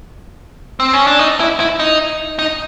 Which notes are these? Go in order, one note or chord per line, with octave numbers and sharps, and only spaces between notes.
C4
C#4
D4
D#4
E4
E4
D#4
D#4